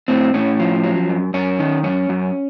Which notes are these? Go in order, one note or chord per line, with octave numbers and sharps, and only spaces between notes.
A2 C4
A2 C#4
F3
F#3
F#2
F#2 C#4
D#3
F#2 C#4
F#2